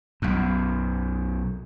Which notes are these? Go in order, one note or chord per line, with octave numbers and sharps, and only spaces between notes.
B1 F#2